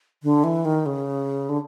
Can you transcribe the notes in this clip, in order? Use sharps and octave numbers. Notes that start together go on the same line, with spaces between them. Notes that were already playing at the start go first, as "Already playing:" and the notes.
D3
E3
D#3
C#3
D3